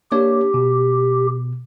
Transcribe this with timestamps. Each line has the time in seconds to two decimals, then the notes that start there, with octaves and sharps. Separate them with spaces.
0.12 A#3 D4 G4 C#5
0.54 B2